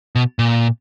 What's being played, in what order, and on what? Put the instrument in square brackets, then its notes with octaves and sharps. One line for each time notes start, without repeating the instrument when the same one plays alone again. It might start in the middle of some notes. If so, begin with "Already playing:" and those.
[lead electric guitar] B2
A#2